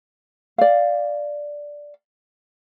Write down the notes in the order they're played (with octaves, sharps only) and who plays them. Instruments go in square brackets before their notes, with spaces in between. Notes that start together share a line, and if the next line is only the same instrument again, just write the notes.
[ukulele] D5 F5